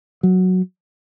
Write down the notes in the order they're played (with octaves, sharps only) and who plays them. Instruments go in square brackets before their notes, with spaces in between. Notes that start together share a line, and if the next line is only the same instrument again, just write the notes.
[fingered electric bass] F#3